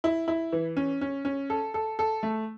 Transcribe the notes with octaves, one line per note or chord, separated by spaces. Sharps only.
E4
E4
E3
C#4
C#4
C#4
A4
A4
A4
A3